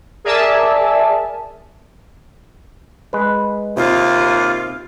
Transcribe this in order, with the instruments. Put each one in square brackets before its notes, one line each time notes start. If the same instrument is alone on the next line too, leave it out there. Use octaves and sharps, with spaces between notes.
[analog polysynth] G#4 A#4 D5 E5 G#5 A5
[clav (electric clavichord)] G#3 B4
[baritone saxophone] D#2 [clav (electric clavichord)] C3 [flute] F4